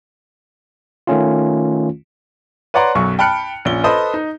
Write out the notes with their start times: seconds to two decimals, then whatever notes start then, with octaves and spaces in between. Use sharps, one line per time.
1.07 D#3 A3 C#4 F4
2.74 B4 C#5 D5 F#5 A#5 C6
2.95 B1 F#2 F#3 C#6
3.19 G5 A5 B5 F6 F#6 C#7
3.65 A#1 C#4 G7
3.84 A4 B4 C5 D#5 B5
4.14 D#4